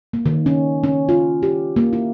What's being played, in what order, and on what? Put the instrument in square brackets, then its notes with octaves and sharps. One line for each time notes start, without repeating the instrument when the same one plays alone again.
[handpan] A#3
D#3
C#4
C#4
F4
G4
A#3
E4